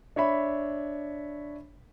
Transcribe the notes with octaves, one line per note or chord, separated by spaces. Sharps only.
D4 C#5 E5 B5